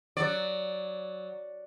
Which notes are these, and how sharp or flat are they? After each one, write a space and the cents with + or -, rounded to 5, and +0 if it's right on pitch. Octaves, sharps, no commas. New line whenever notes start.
F#3 +0 D5 +0